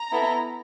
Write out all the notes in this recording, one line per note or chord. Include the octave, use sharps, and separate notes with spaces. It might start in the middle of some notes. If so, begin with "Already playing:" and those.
Already playing: A#5
B3 E4 A4